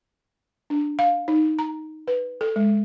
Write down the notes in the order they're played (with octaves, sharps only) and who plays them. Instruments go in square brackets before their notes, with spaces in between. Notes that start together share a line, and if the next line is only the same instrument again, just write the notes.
[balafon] D4
F5
D#4
A#5
B4
A4
G#3